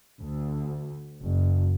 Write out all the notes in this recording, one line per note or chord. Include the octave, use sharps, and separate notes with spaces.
D2
F#1